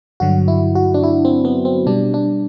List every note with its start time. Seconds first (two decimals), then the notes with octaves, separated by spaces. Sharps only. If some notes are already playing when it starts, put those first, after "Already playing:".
0.20 G2 D3 F#3 F#4
0.48 E4
0.75 F#4
0.94 D4
1.03 E4
1.25 C4
1.45 B3
1.65 C4
1.86 B2 G3 D4
2.14 D4